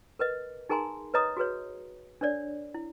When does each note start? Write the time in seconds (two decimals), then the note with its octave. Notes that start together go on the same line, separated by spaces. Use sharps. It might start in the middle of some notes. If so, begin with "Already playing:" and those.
0.19 A#4 B4 D#5
0.69 D#4 G#4 A#4 G#5 A#5 C6
1.14 B4 C#5 D#5 A#5 D#6
1.37 F#4 G#4 B4 C#5
2.21 D4 A#4 C#5 D5
2.74 E4